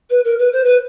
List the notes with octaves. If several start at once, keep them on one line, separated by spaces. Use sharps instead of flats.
B4
A#4
B4
C5
B4